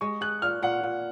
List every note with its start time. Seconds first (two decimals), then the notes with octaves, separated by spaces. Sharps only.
0.01 G#3 C#6
0.21 G#4 F#6
0.42 A#2 F6
0.62 A#2 F#5
0.83 A#2